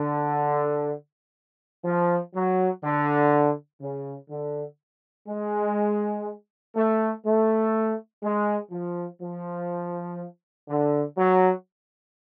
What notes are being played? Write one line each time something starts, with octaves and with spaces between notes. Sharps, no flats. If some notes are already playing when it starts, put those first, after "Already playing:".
Already playing: D3
F3
F#3
D3
C#3
D3
G#3
A3
A3
G#3
F3
F3
D3
F#3